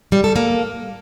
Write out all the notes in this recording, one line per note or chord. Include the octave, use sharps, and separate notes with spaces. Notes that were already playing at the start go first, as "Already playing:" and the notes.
G3
A4
A#3